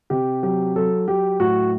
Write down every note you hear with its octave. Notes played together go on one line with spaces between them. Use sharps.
C3 G4
F#3 G4
F#3 A4
F#3 G4
A2 F#4